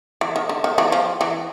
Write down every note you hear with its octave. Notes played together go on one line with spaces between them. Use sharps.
E3
D#3
D3
D#3
E3
F3
E3